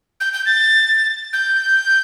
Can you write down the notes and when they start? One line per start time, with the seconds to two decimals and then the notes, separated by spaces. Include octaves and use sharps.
0.21 G6
0.33 G6
0.46 A6
1.33 G6